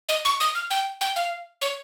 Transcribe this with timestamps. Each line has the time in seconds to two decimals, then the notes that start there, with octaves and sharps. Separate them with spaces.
0.09 D#5
0.25 C#6
0.40 D#6
0.55 F6
0.70 G5
1.01 G5
1.16 F5
1.62 C#5